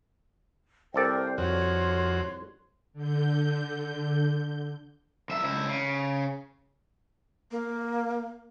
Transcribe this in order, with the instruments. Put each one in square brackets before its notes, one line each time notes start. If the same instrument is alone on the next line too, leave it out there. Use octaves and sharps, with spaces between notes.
[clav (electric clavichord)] C2 A4 D5 [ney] A#4 [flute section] C5 G5
[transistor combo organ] F2 F#4 [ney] C#5 [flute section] C6
[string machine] D3 G6
[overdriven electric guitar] B1 E5
C#2 E4
C#3
[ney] A#3